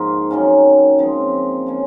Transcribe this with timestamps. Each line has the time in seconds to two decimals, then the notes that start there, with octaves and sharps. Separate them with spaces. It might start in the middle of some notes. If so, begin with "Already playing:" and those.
Already playing: G#2 F3 A#3 F4
0.31 F#2 D#3 A#3 C#4
0.99 C#3 F3 G#3 C4
1.67 F3 A#3 C#4